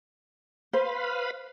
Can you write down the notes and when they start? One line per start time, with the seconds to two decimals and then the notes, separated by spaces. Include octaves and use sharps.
0.73 B4 C5 F5 B5